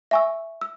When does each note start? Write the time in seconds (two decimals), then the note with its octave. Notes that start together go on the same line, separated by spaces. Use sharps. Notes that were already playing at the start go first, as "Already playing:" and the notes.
0.11 E5 G#5 C#6 E6
0.61 E6